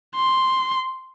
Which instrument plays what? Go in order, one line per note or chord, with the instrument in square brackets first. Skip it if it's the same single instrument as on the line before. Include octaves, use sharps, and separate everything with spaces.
[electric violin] C6